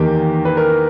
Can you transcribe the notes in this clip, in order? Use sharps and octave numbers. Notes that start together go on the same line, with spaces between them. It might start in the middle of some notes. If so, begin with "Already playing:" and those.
Already playing: E2 D#3 A#3 G4
B4
A#4